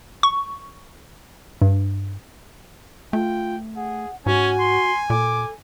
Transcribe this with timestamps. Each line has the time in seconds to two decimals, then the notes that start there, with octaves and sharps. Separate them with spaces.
0.23 C#6
1.62 G2
3.13 A3 F4 G5
3.76 G#4 F#5
4.26 G#2 C#4 F#4 G#5
4.59 C6
5.10 A#2 A4 D6